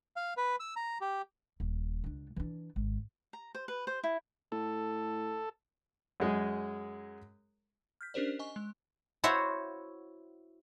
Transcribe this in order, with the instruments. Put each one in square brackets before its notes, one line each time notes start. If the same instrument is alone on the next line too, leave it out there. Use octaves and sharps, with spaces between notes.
[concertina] F5
B4
E6
A#5
G4
[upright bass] D#1
C#2 D4
E3 D4
G#1
[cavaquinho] A#5
C5
B4
C5
E4
[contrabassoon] A2 [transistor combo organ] A4
[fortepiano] F#2 G#3 G#4
[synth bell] F6 G6 B6
C#4 D4 G4 A#4 C5 D5
D#5 G#5 C#6
G#3
[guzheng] E4 F#4 C5 C#5 E5 F5